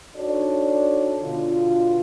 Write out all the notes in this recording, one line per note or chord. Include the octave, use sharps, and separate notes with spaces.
D4 D#4 F#4 A4 C#5 D5
B2 D3 F4